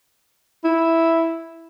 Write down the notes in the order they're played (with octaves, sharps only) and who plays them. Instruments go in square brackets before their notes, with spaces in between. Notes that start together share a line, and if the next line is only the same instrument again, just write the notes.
[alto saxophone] E4